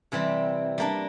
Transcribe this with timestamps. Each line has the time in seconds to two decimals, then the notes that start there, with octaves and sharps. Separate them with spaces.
0.12 C3 E3 G3 C4
0.78 G3 A#3 D4